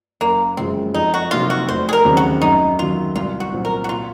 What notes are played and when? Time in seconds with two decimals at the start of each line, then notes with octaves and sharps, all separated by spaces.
0.21 F#1 A#3
0.57 F#2 C#3 F3 G#3 C4
0.94 F2 D#4
1.14 F#4
1.31 C3 F#3 A#3 D#4 F4
1.50 F#4
1.68 F1 C5
1.89 G#4
1.93 A#4
2.05 D#2 C#3 F#3 C4
2.17 F#4
2.42 F#2 D#4
2.79 D#3 F#3 F4
3.16 C2 F4
3.40 F#4
3.53 A#2 F#3 C4
3.65 A#4
3.84 F#4
3.89 A#2 F4